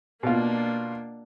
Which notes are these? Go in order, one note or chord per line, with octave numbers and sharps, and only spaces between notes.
B2 A#3 D4 F4